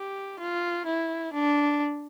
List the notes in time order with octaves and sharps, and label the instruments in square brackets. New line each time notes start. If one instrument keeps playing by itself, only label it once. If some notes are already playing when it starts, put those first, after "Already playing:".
Already playing: [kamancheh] G4
F4
E4
D4